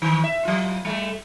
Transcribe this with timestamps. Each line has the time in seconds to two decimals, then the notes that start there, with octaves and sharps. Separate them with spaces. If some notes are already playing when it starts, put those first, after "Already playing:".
0.02 D#3
0.24 E5
0.45 F#3 F4
0.85 G3 A3